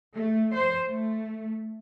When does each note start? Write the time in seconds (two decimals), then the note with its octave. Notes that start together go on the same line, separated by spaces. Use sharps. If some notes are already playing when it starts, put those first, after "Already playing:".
0.15 A3
0.54 C5
0.88 A3